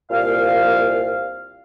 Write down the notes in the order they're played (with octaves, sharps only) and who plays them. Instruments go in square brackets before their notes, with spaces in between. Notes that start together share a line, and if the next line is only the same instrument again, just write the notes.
[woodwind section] C2 A#2 F5